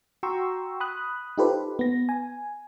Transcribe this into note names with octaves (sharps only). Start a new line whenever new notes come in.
F#4 G5 A#5 C6 C#6 E6
B5 D#6 F#6
D#4 F4 G4 A4 B4 C5
B3 A#6
G#5